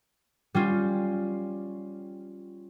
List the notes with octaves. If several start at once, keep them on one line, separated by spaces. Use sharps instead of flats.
G3 C#4 F4